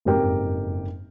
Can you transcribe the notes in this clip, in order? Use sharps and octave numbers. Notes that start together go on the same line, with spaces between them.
F#1 F2 G#2 G4 A#4 G5